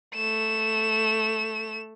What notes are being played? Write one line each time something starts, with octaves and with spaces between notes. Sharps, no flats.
A3 E7